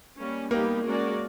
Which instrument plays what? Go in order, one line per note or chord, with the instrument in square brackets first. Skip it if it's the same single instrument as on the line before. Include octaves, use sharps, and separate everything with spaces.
[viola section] G3 A#3 C#4
[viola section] G3 B3 D#4 G4 [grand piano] A#3
[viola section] G#3 C#4 F#4 A#4 D5